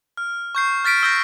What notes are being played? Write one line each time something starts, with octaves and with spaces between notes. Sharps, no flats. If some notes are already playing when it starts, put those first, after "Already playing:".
F6
C#6 G6 C7
F6 A6 B6 D7
E6 G6 A#6